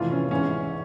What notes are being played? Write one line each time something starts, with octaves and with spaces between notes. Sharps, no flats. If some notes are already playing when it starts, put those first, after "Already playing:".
Already playing: F1 F2 E3 F4
C#4
G#1 G#2 E3 C#4